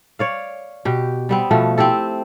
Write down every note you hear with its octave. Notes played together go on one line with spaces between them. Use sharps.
C#5 D5 F5
B2 G4
G3 B3 C4
B2 F3 A3
C4 E4 G4 A4